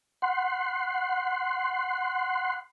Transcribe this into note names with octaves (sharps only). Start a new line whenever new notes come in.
F#5 C6